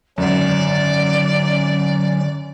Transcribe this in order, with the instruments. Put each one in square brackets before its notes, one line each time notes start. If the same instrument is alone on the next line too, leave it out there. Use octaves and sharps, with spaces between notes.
[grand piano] G#1 F#2 [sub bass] D3 [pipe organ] F#3 C#4 [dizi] D5